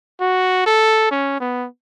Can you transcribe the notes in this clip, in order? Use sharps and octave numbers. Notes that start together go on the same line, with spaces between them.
F#4
A4
C#4
B3